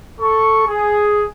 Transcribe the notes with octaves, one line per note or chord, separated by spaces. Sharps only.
A4 C#6
G#4